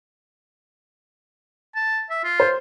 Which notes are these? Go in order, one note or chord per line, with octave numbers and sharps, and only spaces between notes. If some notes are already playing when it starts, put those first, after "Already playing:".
A5
E5
F4
C5